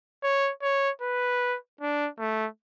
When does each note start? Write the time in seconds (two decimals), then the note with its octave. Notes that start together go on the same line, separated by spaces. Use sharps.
0.23 C#5
0.62 C#5
1.01 B4
1.81 D4
2.19 A3